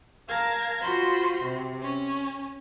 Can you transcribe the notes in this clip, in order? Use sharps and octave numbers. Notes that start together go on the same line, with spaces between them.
A#4 F5 A5 G#6
F4 F#4 C5 B5 C6
C3
C#4